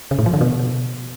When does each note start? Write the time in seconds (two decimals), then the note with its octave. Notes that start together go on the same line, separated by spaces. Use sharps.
0.11 C#3
0.19 A2
0.26 F3
0.33 D3
0.41 B2